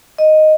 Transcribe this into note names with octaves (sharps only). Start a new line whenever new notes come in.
D#5